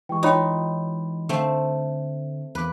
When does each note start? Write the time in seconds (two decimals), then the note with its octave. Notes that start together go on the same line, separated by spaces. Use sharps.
0.09 E3 G#3 G4 G5 C#6
0.23 D#4 F4 C#5 D#5 G5 B5 C6
1.29 D3 A3 C4
2.55 E2 B4 D6